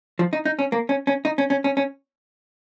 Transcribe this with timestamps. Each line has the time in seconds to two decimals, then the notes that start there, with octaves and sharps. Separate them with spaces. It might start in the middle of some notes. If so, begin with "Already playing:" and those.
0.19 F3
0.33 D#4
0.45 D#4
0.59 C#4
0.72 A#3
0.89 C#4
1.07 C#4
1.25 D#4
1.38 C#4
1.50 C#4
1.64 C#4
1.77 C#4